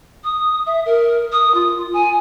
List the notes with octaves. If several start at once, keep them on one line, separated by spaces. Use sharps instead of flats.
D#6
E5
A#4
D#6
F4
G#5